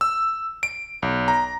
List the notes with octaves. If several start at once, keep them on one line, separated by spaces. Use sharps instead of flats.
E6
D7
B1
A#5